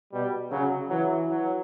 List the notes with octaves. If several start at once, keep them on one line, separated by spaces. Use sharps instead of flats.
B2 G3
C#3 F#3
E3 F#3
F#3